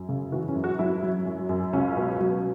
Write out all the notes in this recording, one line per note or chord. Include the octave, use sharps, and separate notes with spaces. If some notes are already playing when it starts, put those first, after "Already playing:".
Already playing: F#2
C#3
E3 F#4
C#4
F#2
F#4
F#3 E4
F#3
F#2
F#2
C#2 C#4
B2
F#3